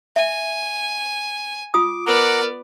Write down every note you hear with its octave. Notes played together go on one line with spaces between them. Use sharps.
E5 G#5
F4 D6 D#6
B3 A#4 D5 F#5 A#5 D6